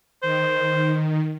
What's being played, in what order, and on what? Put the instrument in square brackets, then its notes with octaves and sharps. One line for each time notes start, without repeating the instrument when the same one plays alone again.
[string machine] D#3 [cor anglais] C5